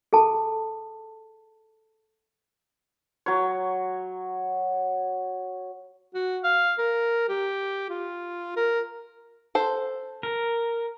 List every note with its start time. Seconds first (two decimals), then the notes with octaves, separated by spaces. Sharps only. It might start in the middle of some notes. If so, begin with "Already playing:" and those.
0.13 G#4 A4 A5
3.26 F#3 C#5
6.15 F#4
6.44 F5
6.79 A#4
7.29 G4
7.89 F4
8.57 A#4
9.55 A4 C5
10.23 A#4